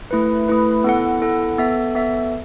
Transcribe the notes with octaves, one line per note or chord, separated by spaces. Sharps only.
A3 E4 B4
A3 E4 B4
B3 E4 A4 F#5
B3 E4 A4 F#5
B3 A4 E5
B3 A4 E5